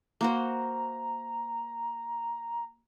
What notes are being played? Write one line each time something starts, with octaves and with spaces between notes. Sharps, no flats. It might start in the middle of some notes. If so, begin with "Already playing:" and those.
A#3 F#4 C5 A#5